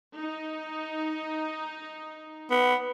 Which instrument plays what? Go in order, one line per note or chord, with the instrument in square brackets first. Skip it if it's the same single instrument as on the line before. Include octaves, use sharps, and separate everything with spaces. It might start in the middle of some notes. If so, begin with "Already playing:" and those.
[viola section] D#4
[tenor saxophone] B3